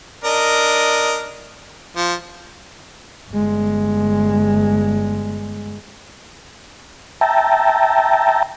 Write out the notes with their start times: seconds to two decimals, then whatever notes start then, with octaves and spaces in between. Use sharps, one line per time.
0.24 D4 A#4 D#5
1.96 F3
3.31 G1 G#3
7.21 E5 G5 A5 A#5